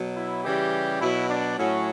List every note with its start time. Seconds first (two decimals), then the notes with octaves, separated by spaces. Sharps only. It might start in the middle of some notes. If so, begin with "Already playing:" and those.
Already playing: B2 F#3
0.16 E4
0.44 C#3 E3 G3 G4
1.00 B2 F#3 E4
1.28 D4
1.57 A2 F#3 C#4